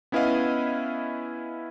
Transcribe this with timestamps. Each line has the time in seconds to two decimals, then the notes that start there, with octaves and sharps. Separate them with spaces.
0.12 B3 C#4 E4 B4 D#5 F5